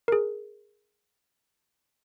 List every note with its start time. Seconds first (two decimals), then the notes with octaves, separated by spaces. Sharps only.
0.08 G#4 A#4